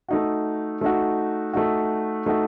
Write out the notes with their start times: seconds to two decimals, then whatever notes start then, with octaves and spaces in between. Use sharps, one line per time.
0.08 A3 D#4 F#4
0.81 A3 D#4 F#4
1.53 A3 D#4 F#4
2.26 A3 D#4 F#4